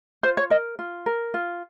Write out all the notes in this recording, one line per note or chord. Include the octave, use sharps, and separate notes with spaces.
F4 C5
C#5
A#4 D#5
F4
A#4
F4